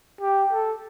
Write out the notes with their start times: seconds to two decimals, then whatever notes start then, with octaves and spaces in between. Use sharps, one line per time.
0.21 G4
0.52 A4